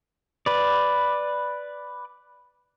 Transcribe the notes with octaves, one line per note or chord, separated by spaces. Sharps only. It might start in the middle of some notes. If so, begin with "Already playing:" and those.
B4 D5